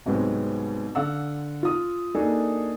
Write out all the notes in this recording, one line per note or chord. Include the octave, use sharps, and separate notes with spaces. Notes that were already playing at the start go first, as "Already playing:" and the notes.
C2 G#2 F#3 G#3 B3 C4
D3 F5 F#5 E6
F4 D#6
A#3 D4 D#4 F#4 G#4 A4